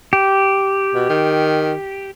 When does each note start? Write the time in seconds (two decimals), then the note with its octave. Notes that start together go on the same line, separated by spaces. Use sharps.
0.13 G4
0.95 B2
1.09 D#3